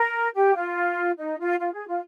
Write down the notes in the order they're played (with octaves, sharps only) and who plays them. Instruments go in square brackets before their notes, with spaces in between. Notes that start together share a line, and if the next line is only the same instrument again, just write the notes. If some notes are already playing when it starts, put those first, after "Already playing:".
Already playing: [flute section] A#4
G4
F4
D#4
F4
F4
G#4
F4